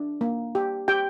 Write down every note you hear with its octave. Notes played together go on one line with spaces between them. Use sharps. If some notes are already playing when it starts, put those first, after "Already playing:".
Already playing: D4
A#3
G4
G4 G5